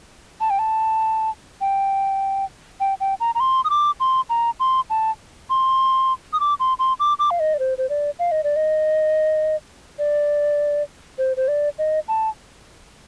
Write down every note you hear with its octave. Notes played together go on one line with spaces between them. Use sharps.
A5
G5
A5
G5
G5
G5
A#5
A#5
C6
D#6
D6
C6
A#5
C6
A5
C6
D#6
D6
C6
C6
D6
D6
F5
D#5
D5
C5
C5
D5
F5
D#5
D5
D#5
D5
C5
C5
D5
D#5
A5